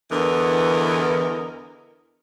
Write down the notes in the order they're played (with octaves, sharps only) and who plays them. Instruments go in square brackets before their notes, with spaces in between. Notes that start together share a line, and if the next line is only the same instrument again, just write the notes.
[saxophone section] E2 D3 E3 B3 A#4 D#5